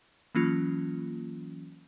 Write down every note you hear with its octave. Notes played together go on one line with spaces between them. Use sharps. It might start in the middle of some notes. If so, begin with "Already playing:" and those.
E3 F#3 A#3 C#4 F4